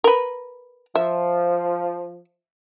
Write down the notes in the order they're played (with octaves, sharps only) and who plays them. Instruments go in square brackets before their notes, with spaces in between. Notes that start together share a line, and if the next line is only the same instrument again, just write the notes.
[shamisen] A#4 B4
[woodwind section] F3 [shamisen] E5